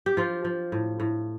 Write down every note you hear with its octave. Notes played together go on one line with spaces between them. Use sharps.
G4
F3 F4
F3
A2
A2